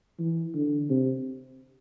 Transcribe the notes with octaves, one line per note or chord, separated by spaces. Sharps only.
E3
D3
C3